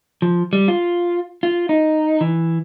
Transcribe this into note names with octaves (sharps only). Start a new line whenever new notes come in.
F3
G3
F4
F4
D#4
E3